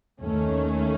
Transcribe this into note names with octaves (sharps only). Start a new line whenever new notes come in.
D#2 D#3 A3 C#4